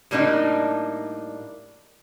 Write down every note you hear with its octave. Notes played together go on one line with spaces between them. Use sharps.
A2 G3 A#3 D4 D#4